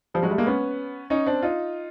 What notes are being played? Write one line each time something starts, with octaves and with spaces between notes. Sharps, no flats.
F3 G3
F#3 G#3
G3 A3
G#3 A#3
B3 C#4
C#4 D#4
C4 D4
D#4 F4